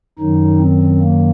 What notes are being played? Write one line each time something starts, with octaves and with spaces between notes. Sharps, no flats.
F#2 D#3 F#3 D#4
C4
A#3